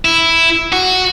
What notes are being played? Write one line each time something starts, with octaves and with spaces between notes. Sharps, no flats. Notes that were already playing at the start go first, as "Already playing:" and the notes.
E4
F#4